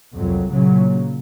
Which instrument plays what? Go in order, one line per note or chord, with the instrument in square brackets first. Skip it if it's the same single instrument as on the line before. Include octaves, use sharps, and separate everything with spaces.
[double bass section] C2 F2 F#3
A#2 C#3 F#3